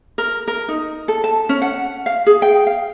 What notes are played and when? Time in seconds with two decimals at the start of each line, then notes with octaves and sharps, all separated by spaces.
0.18 A#4
0.48 A#4
0.68 D#4
1.08 A4
1.24 A5
1.49 C#4
1.62 F#5
2.06 F5
2.27 G#4
2.42 G5
2.67 F5